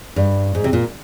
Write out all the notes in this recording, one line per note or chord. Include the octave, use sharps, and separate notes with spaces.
G2
G#2
C3
A#2